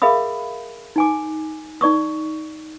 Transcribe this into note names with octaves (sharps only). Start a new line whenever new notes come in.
G#4 A#4 E5 F5 B5 D#6
D#4 G#5 D6
D#4 D5 C#6 D#6